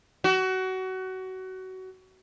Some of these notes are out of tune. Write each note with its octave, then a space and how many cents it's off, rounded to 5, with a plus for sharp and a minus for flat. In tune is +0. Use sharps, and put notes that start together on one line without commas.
F#4 +25